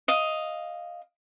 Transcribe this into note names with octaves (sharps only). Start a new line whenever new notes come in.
D#5 F5